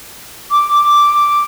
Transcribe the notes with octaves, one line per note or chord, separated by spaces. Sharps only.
D6